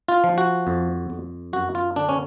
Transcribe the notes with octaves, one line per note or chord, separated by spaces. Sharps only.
F4
F3
F#4
F2
F2
F#2 F#4
F4
D3 D4
C#4